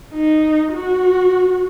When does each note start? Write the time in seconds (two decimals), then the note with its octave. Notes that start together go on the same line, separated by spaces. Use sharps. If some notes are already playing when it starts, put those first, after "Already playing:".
0.13 D#4
0.72 F#4